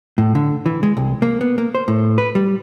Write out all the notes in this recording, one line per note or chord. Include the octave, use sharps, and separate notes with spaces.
A2
D3
E3
G#3
C2
A#3
B3
A#3
C5
A2
B4
G3